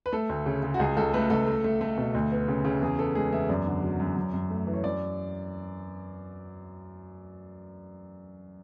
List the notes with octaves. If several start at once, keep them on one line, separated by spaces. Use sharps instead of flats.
B4
A3 A4
D2
C#3
C#3
F#4
C#2 G#4
C#2 A4
A3 B4
C#2 A4
A3
A3
A3
B2
D2
B3
C#3
C#3
E2 G#4
B3 A4
G#3 G#4
E2 E5
F#2 D5
D3
F#3
F#2
F#2
F#2
A3
E3
C#5
F#2 D5